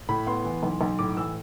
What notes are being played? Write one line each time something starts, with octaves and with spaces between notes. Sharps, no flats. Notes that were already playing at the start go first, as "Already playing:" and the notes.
A2 B5
B3 C6
E3
B1
B1
A2 D6
E3 E6